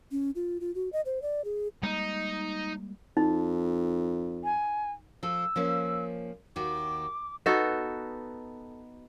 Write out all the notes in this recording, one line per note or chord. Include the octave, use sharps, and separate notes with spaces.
C#4
F4
F4
F#4
D#5
C5
D5
G#4
G3 G#3 A#3 D#4
F2 D#4
G#5
F3 A4 E6
F3 A#3 C#4
D#2 D#3 F#4 D6
B3 D#4 F#4 A4